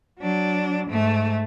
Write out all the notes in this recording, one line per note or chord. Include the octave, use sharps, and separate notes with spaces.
F#3 D4
G#2 A3